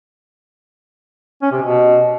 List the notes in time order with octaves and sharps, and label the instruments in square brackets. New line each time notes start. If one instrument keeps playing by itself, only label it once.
[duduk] C#4
C3
B2